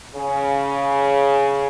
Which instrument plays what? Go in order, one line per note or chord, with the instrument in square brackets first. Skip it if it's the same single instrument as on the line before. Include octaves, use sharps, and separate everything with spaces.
[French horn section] C#3